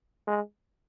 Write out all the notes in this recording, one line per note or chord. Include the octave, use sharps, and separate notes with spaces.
G#3